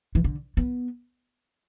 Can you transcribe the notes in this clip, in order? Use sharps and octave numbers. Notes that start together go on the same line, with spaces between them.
E3
D3
B3